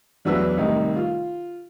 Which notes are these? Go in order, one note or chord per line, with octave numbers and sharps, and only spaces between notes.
E2 F#3 D4 E4 B4 E6
C2 A2 D#3 D#4
F4